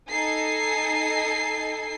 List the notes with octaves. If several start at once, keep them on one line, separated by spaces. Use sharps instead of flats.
D#4 A4 G#5 C7